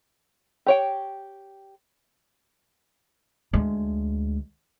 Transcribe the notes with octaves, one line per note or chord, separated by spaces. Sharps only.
G4 C#5 G5
D2 G#3